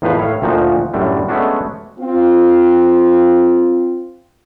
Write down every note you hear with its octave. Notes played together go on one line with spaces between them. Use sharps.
E2 A2 D#3 F3 B4 F5
A2 C#5 F5
D2 A#2 F3 D#4 F#4
F#2 A2 D3 G3
G#3 A3 B3 C#4 D4 F#4
C4 F4